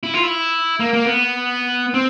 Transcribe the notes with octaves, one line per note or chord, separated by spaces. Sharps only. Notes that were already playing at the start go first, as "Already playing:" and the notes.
E4
F4
E4
A#3
A#3
B3
C4